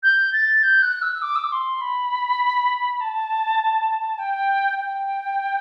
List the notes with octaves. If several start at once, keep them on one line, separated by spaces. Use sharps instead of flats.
G6
A6
G6
F#6
E6
D6
E6
D6
C6
B5
A5
G5
G5